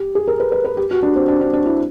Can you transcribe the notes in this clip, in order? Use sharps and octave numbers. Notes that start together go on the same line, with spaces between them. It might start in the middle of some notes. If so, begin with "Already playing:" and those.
Already playing: G4
G#4
A#4
B4
B4
B4
G4
F#4
D4
C4
D4
D4
D4
E4